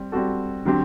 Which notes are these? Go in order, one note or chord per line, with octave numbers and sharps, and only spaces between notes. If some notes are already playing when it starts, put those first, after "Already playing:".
Already playing: G3 C4
G3 C4 F#4 A4
D3 F#3 C4 G4